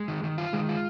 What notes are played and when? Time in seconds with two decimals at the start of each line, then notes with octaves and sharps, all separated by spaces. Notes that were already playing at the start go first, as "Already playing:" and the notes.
Already playing: G#3
0.08 D#3
0.24 D#3
0.38 F4
0.53 D#3 G#3
0.69 F4